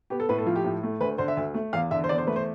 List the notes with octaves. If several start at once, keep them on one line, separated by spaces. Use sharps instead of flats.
B3 G4
A4
A2 B4
A4
F3 F4
G4
A2
A3
D2 B4
D3 C5
E5
D2
A3
E2 F5
D3 E5
C5
E2 D5
C5
A3 B4
C5